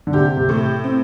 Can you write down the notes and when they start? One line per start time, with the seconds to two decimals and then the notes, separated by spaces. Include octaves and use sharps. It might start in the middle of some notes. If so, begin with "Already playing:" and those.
0.07 D3
0.13 C3 G4
0.37 C3
0.49 A2
0.84 C4